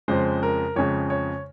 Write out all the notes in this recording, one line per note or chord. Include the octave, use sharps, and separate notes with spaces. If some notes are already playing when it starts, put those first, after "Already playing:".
F2 C#3 G#3 C5
A#4
F2 C#3 G#3 C#5
C#5